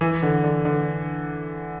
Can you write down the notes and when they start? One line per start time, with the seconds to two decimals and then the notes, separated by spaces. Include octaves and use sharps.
0.01 E3
0.23 D3
0.44 D3
0.65 D3